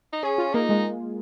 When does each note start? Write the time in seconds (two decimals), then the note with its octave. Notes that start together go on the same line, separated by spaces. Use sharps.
0.13 D#4
0.23 C#4 G#4
0.38 F4
0.54 A#3 D#4
0.69 G#3